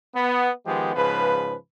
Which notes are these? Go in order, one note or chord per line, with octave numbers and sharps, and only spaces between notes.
B3
D#3 F3 G#3 B3 G4
G#2 C#3 F3 B4